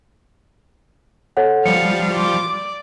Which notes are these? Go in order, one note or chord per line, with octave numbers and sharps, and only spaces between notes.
A4 C#5 F#5
F3 G3 F5 C#7
F4 D6
D5